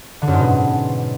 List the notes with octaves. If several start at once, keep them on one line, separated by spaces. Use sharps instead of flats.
D3
F#2
G#2
B2